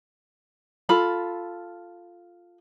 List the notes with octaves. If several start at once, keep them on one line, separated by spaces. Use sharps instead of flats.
F4 A4 B5